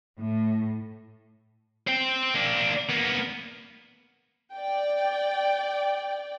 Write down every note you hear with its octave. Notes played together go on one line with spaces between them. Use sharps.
A2
C5 G5
A#3 D4
A#3 B3
D5 G5